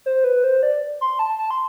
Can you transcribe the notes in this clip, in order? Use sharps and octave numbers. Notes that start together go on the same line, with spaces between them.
C5
B4
C5
D5
C6
A5
A5
C6